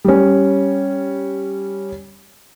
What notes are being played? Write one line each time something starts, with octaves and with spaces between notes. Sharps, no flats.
G3 C#4